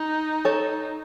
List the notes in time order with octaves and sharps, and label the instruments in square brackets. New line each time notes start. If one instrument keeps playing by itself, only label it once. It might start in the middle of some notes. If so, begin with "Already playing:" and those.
Already playing: [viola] D#4
[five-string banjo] A4 C#5